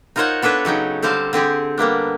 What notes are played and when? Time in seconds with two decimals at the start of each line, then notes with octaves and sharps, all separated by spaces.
0.16 D#4 F4 A#4 C5 C#5 F#5
0.42 B3 D4 A4 B4 C#5
0.65 C#3 F#3 D#4 G5
1.02 D3 G3 C4 C5 F5 A5
1.33 D3 C4 G4 G#4
1.78 G3 A#3 B3 D4